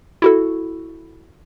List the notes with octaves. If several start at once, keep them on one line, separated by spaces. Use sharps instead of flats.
E4 F#4 A4